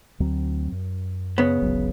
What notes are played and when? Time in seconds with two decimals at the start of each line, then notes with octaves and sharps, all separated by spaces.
0.20 D2 F#3 C4
0.72 F#2
1.38 C#3 B3
1.62 D1 G#1 F#3